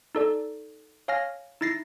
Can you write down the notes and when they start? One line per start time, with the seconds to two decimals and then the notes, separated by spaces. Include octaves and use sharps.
0.15 D#4 A4 D5
1.08 C#5 F5 G#5 F6 A#6
1.61 D#4 E4 A6 A#6 C7